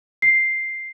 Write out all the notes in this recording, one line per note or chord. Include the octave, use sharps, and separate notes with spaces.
C7